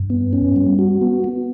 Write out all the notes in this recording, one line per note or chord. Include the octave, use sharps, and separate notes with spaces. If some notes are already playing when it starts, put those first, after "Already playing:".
Already playing: G2
B3
C#4
G3
F#4
B3
B3